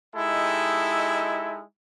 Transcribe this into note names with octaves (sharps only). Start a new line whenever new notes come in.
G#3 D#4 E4 G4 A4